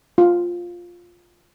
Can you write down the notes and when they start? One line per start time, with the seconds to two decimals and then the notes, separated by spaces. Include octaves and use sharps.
0.18 F4